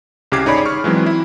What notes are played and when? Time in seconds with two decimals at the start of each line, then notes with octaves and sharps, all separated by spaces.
0.32 C2 C#3 G4 D6 G#6 C7
0.45 G#1 D#4 G#4 C#5 D5 B5
0.66 C#6 F6
0.84 E3 F#3 G#3 C4
1.06 E4